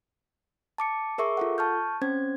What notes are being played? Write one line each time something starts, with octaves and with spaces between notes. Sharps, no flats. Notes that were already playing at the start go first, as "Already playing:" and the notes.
A5 D6 C#7
G#4 A#4 E5 C#6 D6
F4 A4 F#5
A5 C#6 F6 G6
C4 C#4 C5 G#6